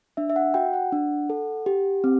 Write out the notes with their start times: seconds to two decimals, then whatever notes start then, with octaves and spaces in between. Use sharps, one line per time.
0.17 D4 E5
0.30 E5
0.36 F#5
0.54 F#4 G5
0.73 F#5
0.92 D4
1.30 A4
1.66 G4
2.04 C4